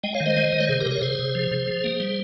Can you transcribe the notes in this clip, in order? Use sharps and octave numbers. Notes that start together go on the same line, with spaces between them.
G#3 D#5 G5
C#5 F5
D#3
C5 D#5
G#3
D#3
C#5
C3 G#4 C5
G4 A#4
C3
A#4 C#5
C3 G#4 C5
C3
F3
C3
F3
A#3
G3